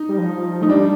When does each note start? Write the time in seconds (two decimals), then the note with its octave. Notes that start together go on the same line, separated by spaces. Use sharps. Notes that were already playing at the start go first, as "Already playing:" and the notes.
Already playing: D#4
0.09 G3
0.18 F3
0.61 A3 D#4
0.69 G3 D4